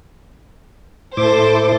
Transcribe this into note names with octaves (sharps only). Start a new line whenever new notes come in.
A2 E4 A4 C5 D6